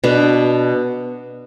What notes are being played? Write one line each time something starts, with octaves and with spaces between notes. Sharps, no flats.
B2 B3 D4